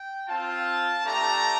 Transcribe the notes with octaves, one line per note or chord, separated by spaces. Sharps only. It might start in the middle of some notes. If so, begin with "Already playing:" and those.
Already playing: G5
C4 F4 A5
A3 D4 G4 A#5